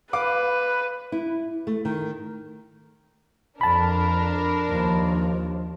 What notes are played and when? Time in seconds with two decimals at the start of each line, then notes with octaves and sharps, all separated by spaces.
0.13 B4 F5 D6
1.12 E4
1.67 A3
1.85 D#3
3.61 F2 D4 A#4 A5 B5
4.69 D#2 F3